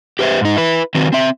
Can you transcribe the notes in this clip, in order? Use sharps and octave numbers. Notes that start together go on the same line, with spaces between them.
G4 B4 C5 E5
G#2 D#4
E4 B4
D#3 F#3 C4 B4
C4 E5